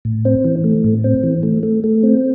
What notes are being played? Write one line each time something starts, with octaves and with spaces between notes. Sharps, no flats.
A2
C4
E3
A3
A2
C4
E3
A3
A3
A3
C4